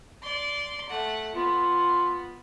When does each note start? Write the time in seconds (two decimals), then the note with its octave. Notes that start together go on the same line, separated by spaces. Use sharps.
0.22 D5 C6
0.89 A3 F#5
1.35 B3 F4